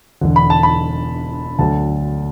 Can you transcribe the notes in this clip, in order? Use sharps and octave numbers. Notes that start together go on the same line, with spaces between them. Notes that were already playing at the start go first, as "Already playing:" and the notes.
E1 E2 D3
B5
A5
B5
D2 D3 F#3 A5